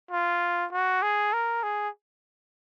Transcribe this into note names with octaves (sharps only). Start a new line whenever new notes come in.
F4
F#4
G#4
A#4
G#4